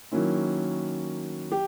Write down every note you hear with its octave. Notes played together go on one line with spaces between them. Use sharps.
D#3 F#3 A#3 C#4 E4
G4